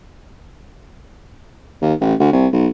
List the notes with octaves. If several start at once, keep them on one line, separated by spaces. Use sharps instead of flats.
D#2
A1
D2
C2
B1